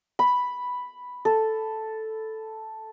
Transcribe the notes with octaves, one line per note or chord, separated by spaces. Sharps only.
B5
A4